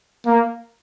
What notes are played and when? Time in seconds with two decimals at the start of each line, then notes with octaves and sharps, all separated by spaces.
0.26 A#3